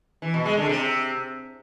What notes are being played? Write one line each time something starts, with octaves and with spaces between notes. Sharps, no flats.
E3
B2
G#3
D3
C3